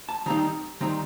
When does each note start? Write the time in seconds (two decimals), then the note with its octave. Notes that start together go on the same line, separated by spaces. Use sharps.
0.09 A5
0.26 D#3 G3 C4 D#4 A#5
0.81 D#3 G3 C4 D#4 A#5